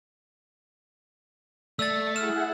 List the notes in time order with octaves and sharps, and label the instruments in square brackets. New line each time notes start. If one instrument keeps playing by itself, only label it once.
[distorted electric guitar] A3 [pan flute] D5 [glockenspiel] E6 A6
[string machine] E4 G#4 F#5 [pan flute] F6 [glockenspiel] E7